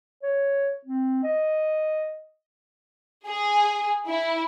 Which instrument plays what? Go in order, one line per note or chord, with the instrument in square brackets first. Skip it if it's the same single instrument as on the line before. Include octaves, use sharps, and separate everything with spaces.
[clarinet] C#5
C4
D#5
[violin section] G#4
E4